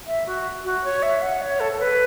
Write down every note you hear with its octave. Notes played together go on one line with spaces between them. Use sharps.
E5
F#4
F#4
C#5
E5
F#5
C#5
A4
A4
B4